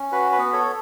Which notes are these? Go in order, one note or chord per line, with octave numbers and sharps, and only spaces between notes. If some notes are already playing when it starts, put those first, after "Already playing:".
Already playing: C#4
F#4 B4
B4
B3
A4 C#5